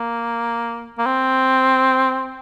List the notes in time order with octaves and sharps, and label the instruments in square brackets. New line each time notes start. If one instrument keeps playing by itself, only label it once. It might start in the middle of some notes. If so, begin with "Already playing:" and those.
Already playing: [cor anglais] A#3
A#3
C4